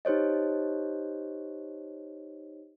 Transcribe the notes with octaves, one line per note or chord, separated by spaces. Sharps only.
D#4 G4 C5 C#5 D#5